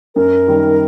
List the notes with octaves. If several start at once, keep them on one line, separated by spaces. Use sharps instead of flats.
F#2 A#4
D#3 G3